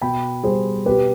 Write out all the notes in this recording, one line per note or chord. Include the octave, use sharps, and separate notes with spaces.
B2 G5 B5
G3 G#4 C5
B2 G4 B4